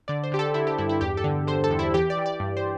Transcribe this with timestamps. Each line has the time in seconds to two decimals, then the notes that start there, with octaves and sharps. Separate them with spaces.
0.08 D3 D5
0.24 C5
0.32 D3 G4
0.39 A4
0.54 D3 E4
0.67 G4
0.78 G2 E4
0.89 E4
1.01 E2 G4
1.17 A4
1.24 D3
1.47 D3 C5
1.64 A4
1.70 E2
1.79 E4
1.94 E3 G4
2.10 D5
2.17 E3
2.26 D5
2.40 G2
2.57 C5